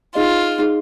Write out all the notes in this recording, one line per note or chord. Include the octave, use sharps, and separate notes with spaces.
D#4 F4 G#4 D#5
D#4 G#4 D#5